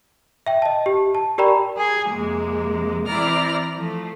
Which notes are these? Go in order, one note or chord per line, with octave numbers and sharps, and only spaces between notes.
E5 G5
D#5 A5
G4
A5
G4 A#4 D5 G5 A#5 B5
G#4 G#6
F2 C3 G#3 A#3
E3 C4 E4 D5 A#5 F6
F3 A3